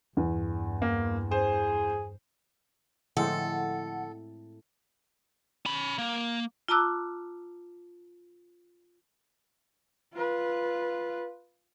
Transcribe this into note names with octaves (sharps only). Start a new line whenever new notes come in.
E2 G2
A#3
G#4 C5
A2 D3 F3 G#3 C4 A4 F#5
C#4 B5
A#3
F4 A5 A#5 D6 E6 F#6
F4 B4